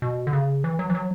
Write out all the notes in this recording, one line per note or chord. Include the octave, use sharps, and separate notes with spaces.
B2
D3
C#3
E3
F#3
E3
F#3